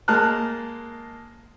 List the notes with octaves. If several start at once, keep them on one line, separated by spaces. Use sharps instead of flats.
G#3 A#3 A5 F6 F#6